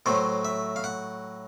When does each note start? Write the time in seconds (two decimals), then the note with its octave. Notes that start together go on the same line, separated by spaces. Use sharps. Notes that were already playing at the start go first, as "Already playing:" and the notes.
0.06 A2 F#3 A3 C5
0.45 E5
0.76 F5
0.84 F#5